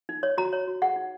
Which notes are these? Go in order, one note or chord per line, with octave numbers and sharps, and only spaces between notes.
D#4
C#5
F#4 A#5
C#5
F#4
G#4 F#5
D#4